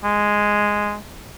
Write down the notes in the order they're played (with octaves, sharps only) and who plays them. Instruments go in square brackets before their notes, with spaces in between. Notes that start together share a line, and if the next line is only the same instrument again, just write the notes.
[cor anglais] G#3